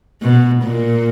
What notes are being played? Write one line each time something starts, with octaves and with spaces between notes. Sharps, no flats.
B2
A#2